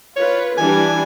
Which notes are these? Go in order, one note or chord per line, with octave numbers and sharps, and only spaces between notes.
F4 B4 C#5
E3 G3 D4 G#5